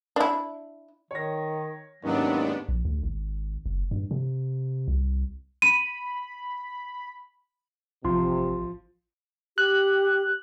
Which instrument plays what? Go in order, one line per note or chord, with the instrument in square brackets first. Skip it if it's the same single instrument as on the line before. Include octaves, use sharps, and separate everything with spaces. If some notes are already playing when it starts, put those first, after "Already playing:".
[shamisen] D4 E4
[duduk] D#3 [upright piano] C#5 A#6
[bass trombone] D#2 [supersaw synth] G#2 B3 D4 [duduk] F#3 [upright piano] C#4
[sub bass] A#1
D2
G#1
F#1
G2
C3
C2
[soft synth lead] B5 [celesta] D#7
[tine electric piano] A1 C6 [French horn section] C3 [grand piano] F3
[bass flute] G4 [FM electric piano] F#6